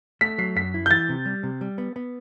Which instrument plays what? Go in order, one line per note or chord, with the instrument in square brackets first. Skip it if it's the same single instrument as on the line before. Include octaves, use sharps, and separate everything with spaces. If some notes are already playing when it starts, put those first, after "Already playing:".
[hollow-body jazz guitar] A3 [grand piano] B6
[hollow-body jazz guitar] F#3 [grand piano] C7
[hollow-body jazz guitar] F#2 [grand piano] B6
[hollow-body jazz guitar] E4
[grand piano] G6
[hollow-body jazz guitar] E3 [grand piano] A6
[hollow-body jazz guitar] C3
G3
C3
G3
B3
B3